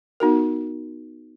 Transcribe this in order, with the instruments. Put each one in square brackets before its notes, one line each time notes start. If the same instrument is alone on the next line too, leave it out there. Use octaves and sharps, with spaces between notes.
[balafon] B3 D#4 F#4 A#4